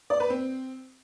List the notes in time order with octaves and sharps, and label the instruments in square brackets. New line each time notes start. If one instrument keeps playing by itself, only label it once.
[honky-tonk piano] D5
B4
C4